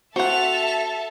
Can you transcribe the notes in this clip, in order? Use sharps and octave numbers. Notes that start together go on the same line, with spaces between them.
C4 F#4 A4 E5 F#5 A5 A6 F7